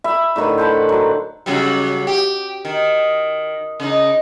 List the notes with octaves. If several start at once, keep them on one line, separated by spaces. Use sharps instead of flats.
E5 B5
A2 D3 D#3 B4
C5 F#5 A5 B5
F#3
C#3 F#3 G3
G4
D#3
C#3 D#4